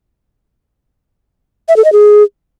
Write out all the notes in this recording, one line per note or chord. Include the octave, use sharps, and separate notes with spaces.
E5
A4
D#5
G#4